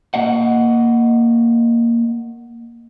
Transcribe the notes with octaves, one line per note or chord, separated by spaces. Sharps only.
A#3 D#5 F#5